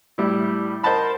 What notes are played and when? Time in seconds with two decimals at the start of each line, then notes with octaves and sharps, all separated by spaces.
0.18 A2 G3 E4
0.83 A#4 C5 D#5 F#5 A5 B5